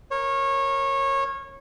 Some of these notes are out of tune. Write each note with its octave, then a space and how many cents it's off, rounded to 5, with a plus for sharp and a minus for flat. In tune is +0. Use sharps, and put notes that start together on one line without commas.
A#4 +0 C#5 -20